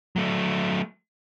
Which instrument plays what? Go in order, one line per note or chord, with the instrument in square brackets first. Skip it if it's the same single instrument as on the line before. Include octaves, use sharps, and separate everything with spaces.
[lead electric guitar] F#3 A3